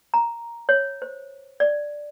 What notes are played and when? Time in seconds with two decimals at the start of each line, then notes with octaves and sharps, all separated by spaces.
0.14 A#5
0.69 C#5
1.02 C5
1.60 D5